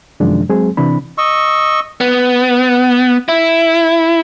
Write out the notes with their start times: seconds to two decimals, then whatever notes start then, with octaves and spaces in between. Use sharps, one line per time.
0.20 F#2 C3 D#3 F3 G#3 D4
0.49 F#3 G#3 C4 G#4
0.77 C3 E3 C4 D4 B5
1.18 D#5 C#6 E6
2.01 B3
3.29 E4